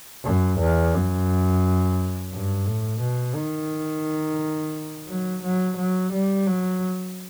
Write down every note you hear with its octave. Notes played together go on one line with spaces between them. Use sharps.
F#2
E2
F#2
G2
A2
B2
D#3
F#3
F#3
F#3
G3
F#3